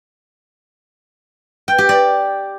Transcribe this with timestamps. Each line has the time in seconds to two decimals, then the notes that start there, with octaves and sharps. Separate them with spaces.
1.68 G5
1.78 G4
1.89 D5